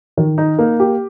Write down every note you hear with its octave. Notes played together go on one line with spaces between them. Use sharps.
D#3
D#4
A#3
G4